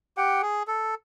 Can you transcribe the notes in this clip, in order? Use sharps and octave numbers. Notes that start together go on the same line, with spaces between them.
G4 F#5 G5
G#4
A4